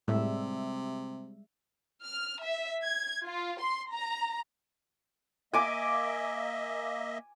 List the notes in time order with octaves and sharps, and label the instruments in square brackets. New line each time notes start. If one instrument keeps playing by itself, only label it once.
[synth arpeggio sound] A2 [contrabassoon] C3 [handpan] G3 G#3 E5
[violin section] F6
E5
G#6
F4
C6
A#5
[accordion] A#3 D#5 E5 [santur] G#5 D6